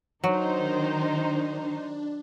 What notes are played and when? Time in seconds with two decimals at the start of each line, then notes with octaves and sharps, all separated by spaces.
0.24 D#3 F#3 D4 D#4 C5